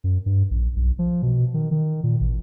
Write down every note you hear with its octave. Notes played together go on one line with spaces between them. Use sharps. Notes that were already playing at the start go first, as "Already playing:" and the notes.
F#2
G2
A#1
B1
F3
B2
D#3
D#3
A#2
A1